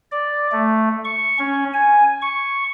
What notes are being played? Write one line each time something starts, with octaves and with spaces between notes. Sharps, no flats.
D5
A3
C#6
C#4
G#5
C#6